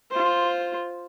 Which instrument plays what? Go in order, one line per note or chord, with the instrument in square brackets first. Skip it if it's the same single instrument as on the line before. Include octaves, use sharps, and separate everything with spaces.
[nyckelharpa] F4 C5